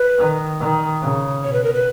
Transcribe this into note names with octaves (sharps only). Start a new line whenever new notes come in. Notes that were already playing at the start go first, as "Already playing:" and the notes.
Already playing: B4
D#3
D#3
C#3
B2 C#5
B4
A#4
B4